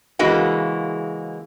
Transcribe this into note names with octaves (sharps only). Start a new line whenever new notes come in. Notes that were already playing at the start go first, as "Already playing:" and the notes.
C#3 E3 G#3 A#3 F#4